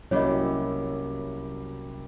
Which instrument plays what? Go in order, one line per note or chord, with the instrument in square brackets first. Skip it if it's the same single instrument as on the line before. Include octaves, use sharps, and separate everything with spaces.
[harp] C2 A#3 G4 [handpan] F#3 C#4 E4 [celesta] C#5 D#5